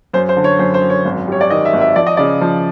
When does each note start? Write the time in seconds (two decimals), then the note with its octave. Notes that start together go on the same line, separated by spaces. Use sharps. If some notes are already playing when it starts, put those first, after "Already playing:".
0.14 F#2 C5
0.29 C5
0.36 D3
0.44 C#5
0.59 F#2 C5
0.74 C5
0.82 F#2
0.90 C#5
1.05 G#1
1.28 G3 C#5
1.41 D5
1.50 D#3 D#5
1.65 E5
1.73 G#1
1.81 E5
1.96 F3 D5
2.06 D#5
2.17 C#3 D5
2.41 F3